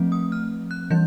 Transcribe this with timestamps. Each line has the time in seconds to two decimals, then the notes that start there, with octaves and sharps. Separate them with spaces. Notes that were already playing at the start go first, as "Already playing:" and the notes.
Already playing: F3 A3 C4
0.12 D#6
0.32 F6
0.71 F#6
0.90 E3 G3 G6